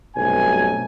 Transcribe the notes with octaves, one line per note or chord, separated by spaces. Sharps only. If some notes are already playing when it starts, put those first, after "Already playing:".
B1 G2 C3 A3 G#5